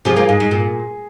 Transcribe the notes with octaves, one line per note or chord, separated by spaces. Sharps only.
C3 F3 G#4
F3 A#3
G#2
G#2
A#2